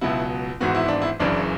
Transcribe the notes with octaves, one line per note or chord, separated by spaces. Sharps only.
C#2 B2 F#3 B3 E4
G#1 G#2 E3 B3 F#4
E4
D4
E4
F#1 F#2 C#3 E3 D4